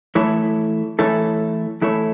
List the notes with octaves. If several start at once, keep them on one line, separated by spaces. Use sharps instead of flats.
E3 A3 E4 A4 C#5
E3 A3 E4 A4 C#5
E3 A3 E4 A4 C#5